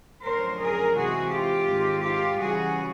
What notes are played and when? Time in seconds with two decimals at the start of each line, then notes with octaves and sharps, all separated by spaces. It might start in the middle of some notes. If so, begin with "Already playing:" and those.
0.24 F#2 D3 F3 A3 C#4 A#4 C5
0.60 G#4 A#4
0.96 C3 E3 G#3 C4 F#4 G#4
1.33 F4 G4
1.69 G#2 D#3 G#3 C4
2.05 F4 G4
2.41 C#3 E3 G3 F#4 G#4